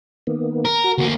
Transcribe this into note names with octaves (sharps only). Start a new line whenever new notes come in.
D#3 A#3 B3
A#4
F#4
D2 A#3